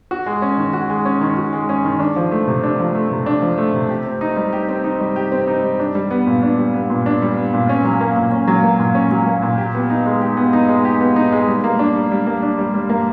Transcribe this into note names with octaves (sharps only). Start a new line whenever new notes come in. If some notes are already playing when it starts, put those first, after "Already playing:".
F#4
G#3
C#4
D#3
F#4
G#3
C#4
D#3
F#4
G#3
C#4
D#3
D4
F3
A3
C3
D4
F3
A3
C3
D4
F3
A3
C3
G4
C4
D#4
G3
G4
C4
D#4
G3
G4
C4
D#4
G3
D4
G3
B3
A#2
D4
G3
B3
A#2
D4
G3
B3
A#2
C#4
F#3
A#3
A#2
C#4
F#3
A#3
A#2
C#4
F#3
A#3
A#2
G4
B3
D#4
G#3
G4
B3
D#4
G#3
G4
B3
D#4
G#3
G3
A#3
D4
G3
G3
A#3
D4
G3
G3
A#3